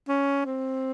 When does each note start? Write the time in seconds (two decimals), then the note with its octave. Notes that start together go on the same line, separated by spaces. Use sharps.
0.08 C#4
0.46 C4